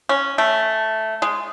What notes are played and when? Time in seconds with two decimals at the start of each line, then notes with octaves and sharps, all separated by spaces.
0.09 C#4
0.38 A3
1.22 G#3